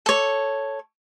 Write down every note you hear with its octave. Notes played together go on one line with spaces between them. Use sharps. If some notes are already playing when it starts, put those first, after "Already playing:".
A4 C#5